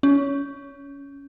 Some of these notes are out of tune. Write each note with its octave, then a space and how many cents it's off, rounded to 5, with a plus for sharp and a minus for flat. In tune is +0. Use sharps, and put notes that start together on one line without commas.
C#4 +20